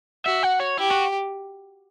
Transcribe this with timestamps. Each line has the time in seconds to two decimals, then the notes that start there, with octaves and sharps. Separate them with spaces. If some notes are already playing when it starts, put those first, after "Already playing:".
0.25 F#4 E5
0.43 F#5
0.60 C#5
0.78 E4 G4
0.91 F#4